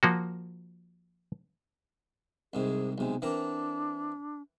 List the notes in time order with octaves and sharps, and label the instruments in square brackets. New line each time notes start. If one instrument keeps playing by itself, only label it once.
[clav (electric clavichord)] F3 A#3 F#4
[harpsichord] C2 G#2 C3 [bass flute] G#4
[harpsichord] B1 C3 [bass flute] G#3
[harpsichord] E3 C4 A#4 [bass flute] D4